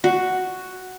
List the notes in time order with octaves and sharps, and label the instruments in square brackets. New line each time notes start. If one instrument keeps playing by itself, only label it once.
[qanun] F#4